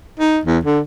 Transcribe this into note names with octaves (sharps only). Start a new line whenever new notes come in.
D#4
E2
D3